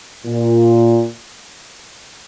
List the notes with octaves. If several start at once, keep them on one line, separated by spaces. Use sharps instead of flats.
A#2